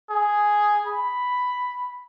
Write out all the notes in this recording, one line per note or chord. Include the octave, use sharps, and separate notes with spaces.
G#4
B5